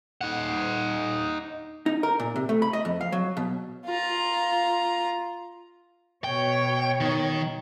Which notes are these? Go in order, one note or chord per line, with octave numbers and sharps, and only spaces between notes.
D#4 F#5
D#4
A#4
A#2
C3
A3
B5
D#5
F2
F5
F#3
B2
F4 A#5
B2 C#5 G5
D#3